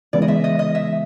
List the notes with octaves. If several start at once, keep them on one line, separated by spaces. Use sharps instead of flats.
C#3 E3 G#3 B3 D5
D#5
E5
D#5
D#5
E5